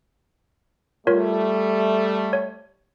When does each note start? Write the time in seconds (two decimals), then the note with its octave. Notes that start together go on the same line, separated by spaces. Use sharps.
1.07 G3 A3 F4 A#4 C#5
2.33 C#5